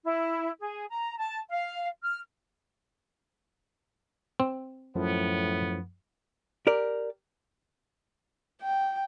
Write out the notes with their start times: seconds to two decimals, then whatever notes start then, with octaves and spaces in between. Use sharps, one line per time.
0.04 E4
0.60 G#4
0.90 A#5
1.18 A5
1.49 F5
2.03 F6
4.40 C4
4.95 F#2 A2 F3 B3
6.67 G4 A#4 D5
8.62 G5